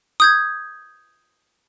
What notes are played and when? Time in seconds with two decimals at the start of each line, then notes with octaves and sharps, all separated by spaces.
0.20 D#6 G6 G#6